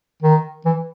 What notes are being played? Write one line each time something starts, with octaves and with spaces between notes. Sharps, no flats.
D#3
E3